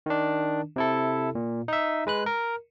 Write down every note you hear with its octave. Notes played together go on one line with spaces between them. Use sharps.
D#3 D4
C3 E4 A4
A#2
D#4 E5
G#3 B4 F#6
A#4